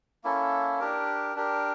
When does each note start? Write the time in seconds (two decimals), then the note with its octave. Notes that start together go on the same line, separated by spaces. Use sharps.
0.24 A#3 C#4 E4 A4
0.79 D4 G4 A#4
1.36 D4 G4 A#4